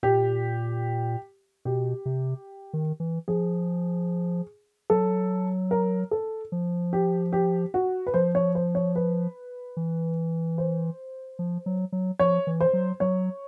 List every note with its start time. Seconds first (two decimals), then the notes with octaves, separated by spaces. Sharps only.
0.03 A#2 G4
1.65 B2 G4
2.06 C3
2.73 D#3
3.00 E3
3.28 F3 G#4
4.90 F#3 A4
5.71 A#4
6.11 A4
6.52 F3
6.93 G4
7.33 G4
7.74 F#4
8.07 B4
8.14 F3 C5
8.35 C#5
8.55 C5
8.75 C#5
8.96 B4
9.77 E3
10.58 C5
11.39 F3
11.66 F#3
11.92 F#3
12.19 F3 C#5
12.47 E3
12.61 C5
12.73 F#3
13.00 F#3 C#5